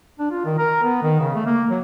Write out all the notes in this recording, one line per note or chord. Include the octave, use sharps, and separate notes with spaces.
D4
F4
D#3
A#4
B3
D#3
C#3
A3
A#3
F#3